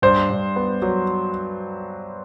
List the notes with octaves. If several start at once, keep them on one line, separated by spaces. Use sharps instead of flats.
G2 C5
G2
B3
F#3